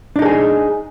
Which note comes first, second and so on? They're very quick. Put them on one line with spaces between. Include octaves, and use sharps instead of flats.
D4 D#4 A4 G#4